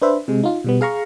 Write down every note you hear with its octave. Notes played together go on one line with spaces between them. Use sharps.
D4 B4 C5 E5
C3 G#3
D#4 F4
B2 G3 B3
G#4 F5 A#5 C#6